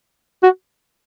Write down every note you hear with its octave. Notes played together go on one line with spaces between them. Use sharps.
F#4